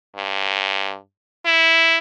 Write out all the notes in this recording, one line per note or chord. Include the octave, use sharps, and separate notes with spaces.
G2
E4